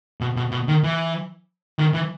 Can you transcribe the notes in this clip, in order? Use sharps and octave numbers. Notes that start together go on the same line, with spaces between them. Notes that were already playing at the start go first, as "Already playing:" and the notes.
B2
B2
B2
D#3
E3
D#3
E3